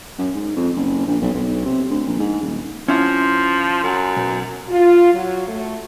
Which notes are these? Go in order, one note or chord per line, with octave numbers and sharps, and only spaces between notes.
F#2
G#2
F2
F#1
A#1
B1
B1
C3
D2
A#1
G#2
D#1
F3 C#4 E4 F#5
F#2
B1
F4
F#3
A3